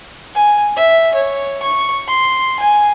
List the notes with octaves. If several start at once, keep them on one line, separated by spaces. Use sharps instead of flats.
G#5
E5
C#5
C#6
C6
G#5